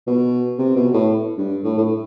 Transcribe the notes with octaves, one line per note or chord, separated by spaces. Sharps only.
B2
C3
B2
A2
G2
A2
A2